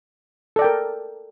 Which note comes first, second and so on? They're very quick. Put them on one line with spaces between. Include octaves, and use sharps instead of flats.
A4 D5 G5 A#4